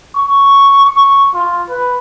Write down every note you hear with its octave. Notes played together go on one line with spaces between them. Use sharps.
C#6
C#6
F4
B4